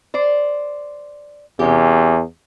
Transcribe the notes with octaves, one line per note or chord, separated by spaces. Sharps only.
C5 D5
E2 C3 C#4 G4